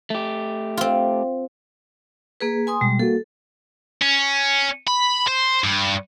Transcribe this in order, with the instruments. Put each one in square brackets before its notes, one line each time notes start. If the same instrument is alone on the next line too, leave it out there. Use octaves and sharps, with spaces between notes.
[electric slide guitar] A3 G4
[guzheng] C4 F4
[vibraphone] A#3 G#4 B4
G#5 C6 D#6
[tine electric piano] B2 G#3 [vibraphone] G3
[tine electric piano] A#3 F#4 [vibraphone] A4
[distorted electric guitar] C#4
B5
C5
G2